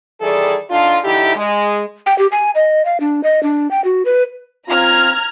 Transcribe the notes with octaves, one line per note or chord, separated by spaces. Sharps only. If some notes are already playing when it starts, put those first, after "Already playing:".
D#3 E3 G3 G#4 A4 D5
D3 D4 D#4 F4
D3 E3 D#4 E4 G4
G#3
G5
G4
G#5
D#5
F5
D4
D#5
D4
G5
F#4
B4
C4 F4 A#5 F6 G#6